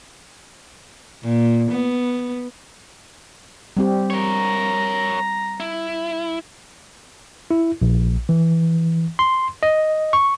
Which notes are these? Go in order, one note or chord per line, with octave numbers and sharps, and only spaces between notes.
A#2
B3
G3 C4 G4
A#4 C#5 A#5
E4
E4
A#1
E3
C6
D#5
C#6